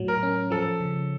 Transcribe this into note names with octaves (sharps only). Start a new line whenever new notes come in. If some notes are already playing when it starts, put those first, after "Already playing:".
Already playing: A2 F#3
A#4
C#4
F3 A4
C#3